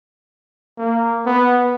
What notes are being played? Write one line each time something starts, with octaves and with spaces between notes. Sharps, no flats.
A#3
B3